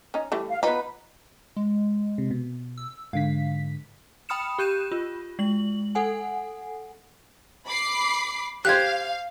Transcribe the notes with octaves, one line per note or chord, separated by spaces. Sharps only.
C#4 D#4
E3 G3 A3
F5
B3 D#4 F4 B4 B5
G#3
C3
B2
E6
G#2 D3 F5 B6
G5 B5 D#6 F6 C#7 E7
G4 F#6 G6 D#7 E7
F4
G#3 F#7
A4 F#5 G#5
B5 D6 C7
G4 C5 F5 F#6 G#6